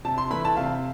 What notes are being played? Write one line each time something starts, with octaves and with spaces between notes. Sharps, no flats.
C3 A5
C6
E3 A3 E4 B5
A5
C3 F5